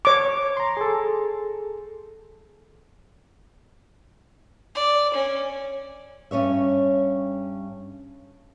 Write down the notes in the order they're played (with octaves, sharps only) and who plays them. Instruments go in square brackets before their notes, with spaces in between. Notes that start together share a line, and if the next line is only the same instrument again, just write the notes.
[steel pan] C#5 D6
[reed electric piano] A#5 C6
G#4 A4
[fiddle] D5
C#4
[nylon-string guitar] G2 C#4 C#5 E5